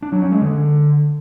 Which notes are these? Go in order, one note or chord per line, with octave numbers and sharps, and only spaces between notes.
D4
F#3
C#4
G#3
D3